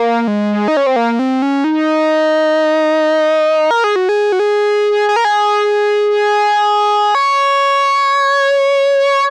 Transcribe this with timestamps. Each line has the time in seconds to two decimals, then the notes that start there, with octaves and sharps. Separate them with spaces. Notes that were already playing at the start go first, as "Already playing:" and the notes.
Already playing: A#3
0.28 G#3
0.68 D#4
0.77 C#4
0.87 C4
0.96 A#3
1.19 C4
1.42 C#4
1.64 D#4
3.71 A#4
3.84 G#4
3.96 F#4
4.09 G#4
4.32 F#4
4.39 G#4
5.09 G#4
5.16 A#4
5.25 G#4
7.15 C#5